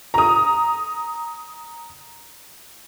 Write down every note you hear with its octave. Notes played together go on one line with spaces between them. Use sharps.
A#5 D#6